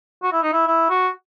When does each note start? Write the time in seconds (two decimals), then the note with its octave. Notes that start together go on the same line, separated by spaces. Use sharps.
0.23 F#4
0.32 E4
0.43 D#4
0.53 E4
0.68 E4
0.90 F#4